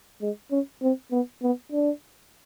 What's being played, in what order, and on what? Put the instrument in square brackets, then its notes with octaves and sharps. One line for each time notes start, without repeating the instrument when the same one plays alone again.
[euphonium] G#3
C#4
C4
B3
B3
D4